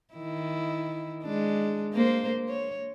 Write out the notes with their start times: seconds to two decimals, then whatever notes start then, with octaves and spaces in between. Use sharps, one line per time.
0.14 D#3 E4
1.24 G#3 D4
1.94 A#3 C5
2.48 C#5